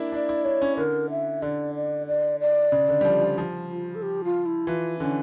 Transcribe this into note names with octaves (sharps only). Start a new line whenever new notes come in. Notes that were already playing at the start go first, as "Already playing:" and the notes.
Already playing: A#3 D4 E4
D4 D5
E4
D4 C#5
C#4
D3 A#4
E5
D3 D5
D5
D5
D5
C#3
D3
G3
F3
F3
F3
F4
A4
G4
F4
E4
E3 F4
D3 C#4